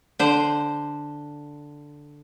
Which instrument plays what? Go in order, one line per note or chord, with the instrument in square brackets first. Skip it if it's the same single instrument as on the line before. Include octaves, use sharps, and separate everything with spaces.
[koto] D3 C5